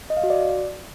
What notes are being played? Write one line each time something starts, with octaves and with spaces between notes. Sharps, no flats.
D#5
F5
F#4
D5